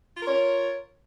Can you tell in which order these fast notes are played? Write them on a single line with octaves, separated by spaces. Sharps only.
F4 A#4 C#5